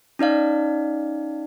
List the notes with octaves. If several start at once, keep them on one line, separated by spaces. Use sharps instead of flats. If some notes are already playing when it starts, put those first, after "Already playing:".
C#4 D#4 D5 F5